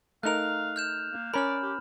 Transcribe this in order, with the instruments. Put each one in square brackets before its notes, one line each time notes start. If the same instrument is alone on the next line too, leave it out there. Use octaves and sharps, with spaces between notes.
[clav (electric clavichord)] A3 D#4 A#4 [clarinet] F5 [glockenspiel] F#6 F7
[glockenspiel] F6 G6 E7
[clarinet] A#3
[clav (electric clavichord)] C#4 A#4 [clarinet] D5 [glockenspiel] B5 F6
[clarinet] G4